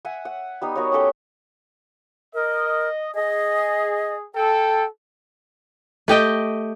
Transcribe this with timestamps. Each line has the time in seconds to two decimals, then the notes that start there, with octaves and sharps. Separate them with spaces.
0.05 E5 F#5 G#5
0.25 F#5
0.62 G3 B3 D#4
0.75 B3 F#4 A#4 C#5
0.92 C#4 G4 A4 G5
2.34 A#4 D#5
3.14 G#4 D#5
4.35 A4 G5
6.08 A3 G4 D#5 G5